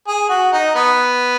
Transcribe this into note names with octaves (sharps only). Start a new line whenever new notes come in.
G#4
F#4
D#4
B3